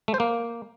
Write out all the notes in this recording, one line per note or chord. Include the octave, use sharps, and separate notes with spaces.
A3
C5
A#3